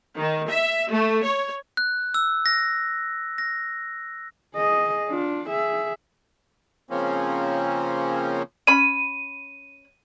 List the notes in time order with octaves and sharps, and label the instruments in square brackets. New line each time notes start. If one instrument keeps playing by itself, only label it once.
[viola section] D#3
E5
A3
C#5
[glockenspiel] F#6
E6
A#6
A#6
[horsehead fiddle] G#4 D#5
D4 F4
G#4 E5
[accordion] C#3 F3 A#3 C4 C#4
[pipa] C#4 B5 [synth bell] D#7